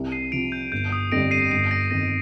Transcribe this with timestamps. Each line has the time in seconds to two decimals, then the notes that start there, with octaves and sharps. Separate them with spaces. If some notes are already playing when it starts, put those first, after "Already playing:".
Already playing: C2
0.12 C7 D#7
0.32 C3 F3 D7 F7
0.52 G6
0.72 G1 G6
0.92 D#6
1.12 F2 D3 G3 A#6 D7
1.31 C7 D#7
1.51 G1 C7 D#7
1.71 A#6 D7
1.91 F2 D#3 A#6